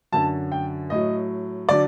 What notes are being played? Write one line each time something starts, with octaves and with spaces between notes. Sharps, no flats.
F#2 D3 F#3 A5
G5
A2 F#3 D#5
D3 F#3 D5